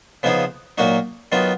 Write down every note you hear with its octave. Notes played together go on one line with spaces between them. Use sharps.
C#3 F3 B3 D#4 G#4
A#2 F#3 A#3 D#4 F#4
D#3 F#3 B3 F4